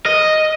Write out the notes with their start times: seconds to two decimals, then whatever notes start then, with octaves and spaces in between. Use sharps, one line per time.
0.06 D#5